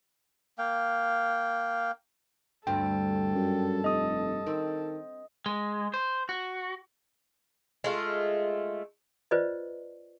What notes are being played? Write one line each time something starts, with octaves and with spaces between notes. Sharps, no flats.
A#3 F5 G5
D2 G2 C4 A4 G5
F#2
F1 D#5 D#6
D#3 C4
G#3
C5
F#4
G#3 A3 F4
F4 B4 C5 D5 D#5